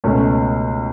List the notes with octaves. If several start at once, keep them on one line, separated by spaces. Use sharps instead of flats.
C#2 B2 A3 C#4